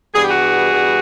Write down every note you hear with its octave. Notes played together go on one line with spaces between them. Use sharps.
G2 E3 G3 B3 G#4
G4
F#4 G#4
G2 E3 G3 B3